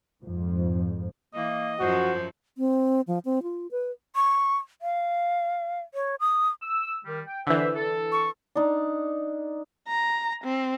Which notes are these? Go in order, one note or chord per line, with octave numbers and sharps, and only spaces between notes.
F2 G#2 F3
E3 A#3 D#5
F#2 F3 F#4 C5
C4
F3
C4
F4
B4
C#6
F5
C#5
D#6
E6
D#3 G3
G5
D3 E3 C5 E5
A4
C#6
D4 D#4
A#5
C4